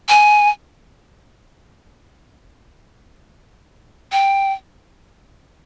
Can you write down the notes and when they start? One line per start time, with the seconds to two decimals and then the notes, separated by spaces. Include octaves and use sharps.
0.09 G#5
4.12 G5